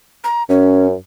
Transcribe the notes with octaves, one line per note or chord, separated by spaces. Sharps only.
A#5
F#2 C#4